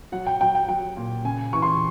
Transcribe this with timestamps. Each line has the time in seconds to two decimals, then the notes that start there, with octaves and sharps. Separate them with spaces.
0.12 F#3 F#5
0.27 G5
0.41 F#3 G5
0.55 G5
0.68 F#3 G5
0.97 A#2
1.24 C#3 G#5
1.53 E3 C#6
1.62 C6